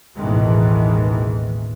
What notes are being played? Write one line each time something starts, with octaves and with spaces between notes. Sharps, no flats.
A1 D#2 B2 D#3 E3 G#3